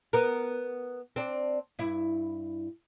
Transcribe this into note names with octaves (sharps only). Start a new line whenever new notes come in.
B3 A#4
C4 D4
G2 E4